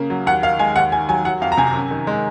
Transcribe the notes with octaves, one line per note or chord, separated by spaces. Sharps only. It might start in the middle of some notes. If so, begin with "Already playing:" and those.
Already playing: C#3 A#3
F#3
D#2 F#5
D#3 F5
G#3 G#5
D#2 F#5
D#3 G#5
F#3 G#5
F#3 F#5
F2 F5
A#5
C3 G#5
F#2
D#3
G#3